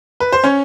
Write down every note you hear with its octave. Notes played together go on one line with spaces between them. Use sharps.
B4
C5
C#4 C#5